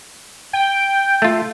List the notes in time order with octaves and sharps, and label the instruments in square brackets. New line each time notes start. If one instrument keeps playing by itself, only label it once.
[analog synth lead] G5
[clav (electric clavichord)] A3 F4